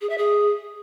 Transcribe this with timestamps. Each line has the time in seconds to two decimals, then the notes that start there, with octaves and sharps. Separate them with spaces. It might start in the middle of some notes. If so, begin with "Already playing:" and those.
0.01 G#4
0.09 E5
0.18 G#4